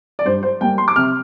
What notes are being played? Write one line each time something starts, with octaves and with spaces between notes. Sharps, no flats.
D5
G2 C5
C5
G3 A#3 G5
C6
D6
C3 F6